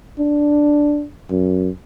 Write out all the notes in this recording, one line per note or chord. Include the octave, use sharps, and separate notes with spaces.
D4
F#2